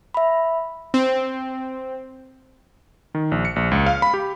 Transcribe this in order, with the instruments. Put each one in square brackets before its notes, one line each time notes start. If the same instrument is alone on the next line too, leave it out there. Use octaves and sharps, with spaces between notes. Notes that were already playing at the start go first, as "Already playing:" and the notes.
[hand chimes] E5 B5
[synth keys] C4
[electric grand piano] D#3
A#1
C#7
A#1
C#2
F5
B5
G4